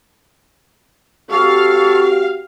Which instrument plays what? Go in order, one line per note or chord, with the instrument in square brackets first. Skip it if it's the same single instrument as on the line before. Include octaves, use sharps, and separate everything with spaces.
[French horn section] C4 F#4 G4 [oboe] A4 [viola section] F5 [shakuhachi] C#6